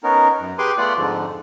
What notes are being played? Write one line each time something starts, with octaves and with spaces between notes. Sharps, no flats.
B3 C#4 D#4 A#4
F#2
G4 G#4 B4 G#5 C6 D6
A3 B3 F4 D5 F#5
F2 G#2 D3 F3